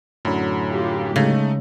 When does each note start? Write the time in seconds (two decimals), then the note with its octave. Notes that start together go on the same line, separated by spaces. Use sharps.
0.25 F#2 A2 D3 F#3 B5
0.69 F4 G4
1.16 C#3 G#3 A3 D#4